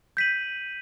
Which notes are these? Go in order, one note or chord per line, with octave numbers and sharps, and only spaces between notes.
G6 B6 D#7 F#7